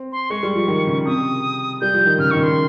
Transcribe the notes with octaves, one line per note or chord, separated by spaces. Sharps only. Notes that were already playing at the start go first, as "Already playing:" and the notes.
Already playing: C4
C6
G#3 C#6
G3
F3
D#3
C#3
C3 D#6
G3 G6
F3
D#3
C#3 F6
D#3 C#6
C#3
C6